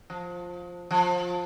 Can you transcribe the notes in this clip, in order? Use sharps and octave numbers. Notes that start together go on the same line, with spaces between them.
F3
F3